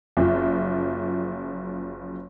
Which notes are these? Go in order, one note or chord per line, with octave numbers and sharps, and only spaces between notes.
F#1 F3